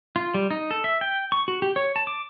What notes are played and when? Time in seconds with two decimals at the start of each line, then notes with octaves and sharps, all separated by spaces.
0.16 F4
0.34 G3
0.51 D#4
0.71 A4
0.84 E5
1.01 G5
1.32 C#6
1.48 F#4
1.62 G4
1.76 C#5
1.96 A5
2.07 D6